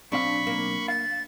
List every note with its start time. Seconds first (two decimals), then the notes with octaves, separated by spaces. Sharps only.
0.12 B1 C4 D4 F5 B5 C#6
0.47 A#3
0.88 F5 A6